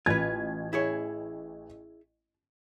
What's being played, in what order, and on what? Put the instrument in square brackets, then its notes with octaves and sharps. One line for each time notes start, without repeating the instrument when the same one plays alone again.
[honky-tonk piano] A1 G#6 [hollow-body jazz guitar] F4 B4
[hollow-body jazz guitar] E4 G#4 C#5